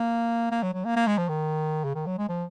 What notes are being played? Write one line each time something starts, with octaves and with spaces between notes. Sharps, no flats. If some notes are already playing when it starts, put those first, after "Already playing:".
Already playing: A#3
A#3
F#3
F#3
A#3
A#3
G#3
F3
D#3
C#3
D#3
F#3
G#3
F3